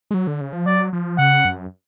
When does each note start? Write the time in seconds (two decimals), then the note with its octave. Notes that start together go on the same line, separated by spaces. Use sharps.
0.11 G#3
0.14 F#3
0.27 D3
0.41 C#3
0.53 F3
0.66 F#3 D5
0.93 F3
1.19 C#3 F#5
1.45 F#2